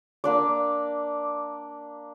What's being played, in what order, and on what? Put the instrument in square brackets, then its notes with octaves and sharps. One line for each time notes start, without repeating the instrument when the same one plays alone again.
[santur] A#3 D4 D5